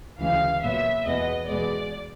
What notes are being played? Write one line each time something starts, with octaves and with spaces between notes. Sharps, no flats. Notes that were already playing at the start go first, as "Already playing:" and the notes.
D2 C#3 E3 G#3 F5
A#2 F#3 B3 E5
E2 B2 G#3 B3 D#5
E2 B2 G#3 B3 D5